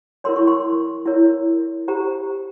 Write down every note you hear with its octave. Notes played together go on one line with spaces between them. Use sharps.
E4 A#4 C#5 C6
C#6
C6
E4 A#4 C#5
G4 C5 A#5